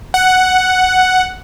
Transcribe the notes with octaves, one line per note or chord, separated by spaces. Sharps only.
F#5